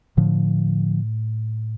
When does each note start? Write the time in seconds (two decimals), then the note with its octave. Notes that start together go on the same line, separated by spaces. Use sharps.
0.17 A2 D3 F3